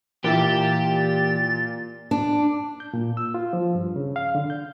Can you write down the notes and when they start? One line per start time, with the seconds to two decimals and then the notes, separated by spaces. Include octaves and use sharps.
0.24 A#2 E3 E4 G4 E5 A6
2.11 D4
2.80 G6
2.93 A#2
3.17 E6
3.34 F4
3.53 F3
3.75 G2
3.96 C#3
4.16 F5
4.35 D3
4.50 G6